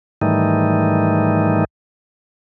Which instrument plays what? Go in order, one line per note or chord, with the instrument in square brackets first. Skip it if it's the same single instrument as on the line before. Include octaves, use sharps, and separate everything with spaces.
[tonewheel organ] G#2 D#3 E3 G3 A3 D#4